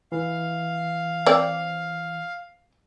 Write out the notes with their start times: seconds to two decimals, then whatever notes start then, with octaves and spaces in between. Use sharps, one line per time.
0.12 E3 F5
1.26 C4 D5